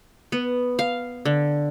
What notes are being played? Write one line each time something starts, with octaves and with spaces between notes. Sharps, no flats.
B3
F5
D3